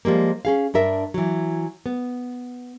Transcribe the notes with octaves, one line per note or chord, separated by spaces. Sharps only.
F3 G3 G#3 A#3
C#4 G#4 F5
G2 D4 A#4 E5
E3 F#3
B3